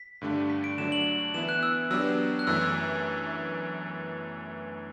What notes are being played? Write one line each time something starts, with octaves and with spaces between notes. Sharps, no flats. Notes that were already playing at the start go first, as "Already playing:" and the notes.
Already playing: B6
G2 D3 A3 D4 G4
B6
D7
D3 F#3 A3 D4 E7
F#7
E3 B3 E4 E7
F#6
E6
F#3 B3 D4 G4 E6
F#6
F#2 E3 A3 E6
E6